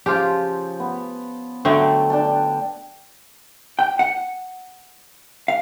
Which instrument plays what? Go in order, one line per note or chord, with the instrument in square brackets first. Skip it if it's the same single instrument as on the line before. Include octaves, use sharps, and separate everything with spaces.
[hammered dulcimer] C#3 F3 [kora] F4 G4
[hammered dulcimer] B3
[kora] D3 F#3 A3 [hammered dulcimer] G5
[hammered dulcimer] D4 G5 A5
[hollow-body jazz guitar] G5
F#5
F5